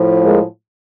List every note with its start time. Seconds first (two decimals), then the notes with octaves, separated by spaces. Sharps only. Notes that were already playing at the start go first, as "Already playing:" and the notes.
Already playing: A2 F3
0.24 G#3 A#3